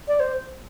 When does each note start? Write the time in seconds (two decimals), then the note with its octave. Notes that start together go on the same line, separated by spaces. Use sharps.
0.08 D5
0.20 C5